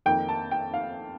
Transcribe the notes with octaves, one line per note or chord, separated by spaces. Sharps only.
F2 D#3 A#3 D#4 G5
A5
G5
F5